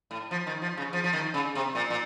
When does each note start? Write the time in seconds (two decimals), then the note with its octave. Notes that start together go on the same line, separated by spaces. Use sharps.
0.11 A2
0.31 F3
0.47 D#3
0.62 F3
0.77 C#3
0.93 F3
1.04 F3
1.13 D#3
1.34 C#3
1.55 C3
1.75 A#2
1.90 A#2